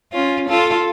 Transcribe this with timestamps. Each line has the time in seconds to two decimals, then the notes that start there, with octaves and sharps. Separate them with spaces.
0.12 C#4 F4
0.49 F4 A4